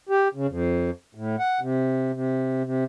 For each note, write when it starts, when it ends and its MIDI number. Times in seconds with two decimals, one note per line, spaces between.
0.09 0.28 67
0.35 0.47 49
0.49 0.90 41
1.15 1.36 45
1.39 1.60 78
1.60 2.13 48
2.13 2.63 48
2.64 2.84 48